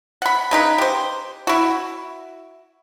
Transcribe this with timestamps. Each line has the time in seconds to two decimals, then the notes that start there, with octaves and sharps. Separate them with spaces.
0.22 F#5 B5
0.51 C#3 D#4 B4
0.78 G4 C5
1.47 E4 F#4